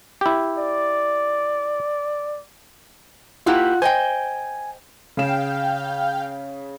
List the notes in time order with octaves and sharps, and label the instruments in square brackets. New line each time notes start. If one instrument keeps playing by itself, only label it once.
[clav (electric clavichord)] E4 G4
[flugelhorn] D5
[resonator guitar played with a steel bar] A#3 E4 G4 [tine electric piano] F4 F#5 F#6
[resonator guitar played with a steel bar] C5 D#5 G5 [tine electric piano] G#5
[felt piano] C#3 G#4 E7 [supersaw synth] F5 G5